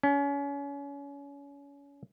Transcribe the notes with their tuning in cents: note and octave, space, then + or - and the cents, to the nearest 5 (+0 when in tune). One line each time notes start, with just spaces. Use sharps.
C#4 +30